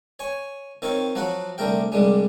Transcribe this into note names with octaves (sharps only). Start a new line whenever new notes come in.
C#5 G#5
D#3 C4 F4 C#5
F3 F#3 F#4 F#5
C2 D3 A3 A#4 G5
C2 F2 D3 G3 G#3